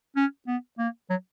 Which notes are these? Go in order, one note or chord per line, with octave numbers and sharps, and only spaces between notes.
C#4
B3
A#3
F#3